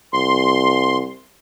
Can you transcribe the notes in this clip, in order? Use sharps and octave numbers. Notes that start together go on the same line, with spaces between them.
C2 C6